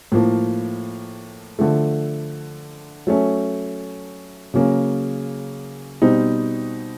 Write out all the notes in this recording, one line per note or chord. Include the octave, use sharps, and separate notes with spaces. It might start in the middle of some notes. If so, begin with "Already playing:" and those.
A2 F3 A#3
D3 F3 A3
F#3 A3 C#4
C#3 F#3 A#3 C#4
B2 G3 C4 D#4